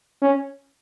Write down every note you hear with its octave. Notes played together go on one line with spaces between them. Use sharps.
C#4